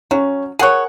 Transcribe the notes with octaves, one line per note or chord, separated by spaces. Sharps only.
F#3 C#4
G#4 A#4 C#5 F#5 F#6